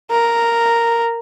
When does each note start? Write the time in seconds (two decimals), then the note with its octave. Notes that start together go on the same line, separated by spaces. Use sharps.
0.11 A#4